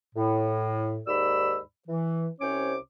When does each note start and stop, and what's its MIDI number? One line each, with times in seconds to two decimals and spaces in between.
0.15 1.00 45
1.08 1.58 39
1.08 1.58 44
1.08 1.58 74
1.08 1.58 83
1.08 1.58 88
1.88 2.28 52
2.41 2.77 36
2.41 2.77 48
2.41 2.77 61
2.41 2.77 72
2.41 2.77 73
2.41 2.77 86